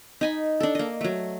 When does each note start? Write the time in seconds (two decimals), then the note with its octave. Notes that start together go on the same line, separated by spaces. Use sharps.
0.21 D#4 G#5 B5
0.60 D4 A4
0.75 A#3 D#5
1.01 F#3 A3